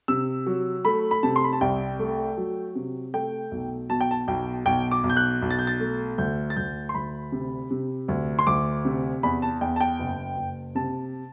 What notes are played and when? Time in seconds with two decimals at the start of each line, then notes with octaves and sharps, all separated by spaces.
0.08 C3 E6
0.46 F#3
0.85 A3 B5
1.11 B5
1.23 C3 A5
1.36 C6
1.44 B5
1.53 A5
1.61 C2 G5
1.99 A3
2.37 F#3
2.75 C3
3.14 A3 G5
3.51 B1
3.89 B2 A5
4.01 G5
4.11 A5
4.28 B1 G5
4.65 B1 G5
4.91 D6
5.04 B1
5.10 G6
5.17 F#6
5.42 B1
5.50 A6
5.59 G6
5.67 A6
5.80 A3
6.18 D2 G6
6.50 A6
6.56 D2 G6
6.89 C6
6.95 D2 B5
7.32 C3
7.71 C3
8.08 D2
8.39 C6
8.47 D2 D6
8.85 C3
9.23 E2 B5
9.42 A5
9.61 E2 G5
9.76 A5
9.81 G5
10.00 F#1
10.37 F#1
10.75 C3 A5